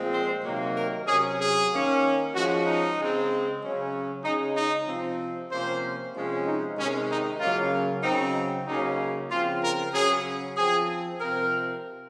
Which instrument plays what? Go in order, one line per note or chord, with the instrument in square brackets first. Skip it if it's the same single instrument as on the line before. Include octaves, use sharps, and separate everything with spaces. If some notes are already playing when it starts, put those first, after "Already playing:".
Already playing: [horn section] A#2 F3 G#3 C4
C5
C3 D#3 F#3 A#3
A#4
C3 F#3 C#4 G#4
G#4
D#3 A#3 C#4
F3 G#3 C#4 F#4
D#4
C#3 G#3 C4
C#3 F#3 C#4
C#3 G#3 C#4 D#4
D#4
C3 F3 C4
C3 F3 A#3 C#4 C5
C3 F3 G#3 C#4
D#4
C3 D#3 G#3 C#4
D#4
C#3 F#3 A#3 C#4 F4
C#3 F#3 C4 D#4
C#3 F#3 A#3 C#4 D#4
C#3 F3 C4 F4
A#4
C#3 F#3 C#4 G#4
F3 C4 G#4
C3 F3 C4 A#4